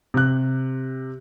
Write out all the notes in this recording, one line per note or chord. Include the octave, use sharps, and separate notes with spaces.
C3 F#6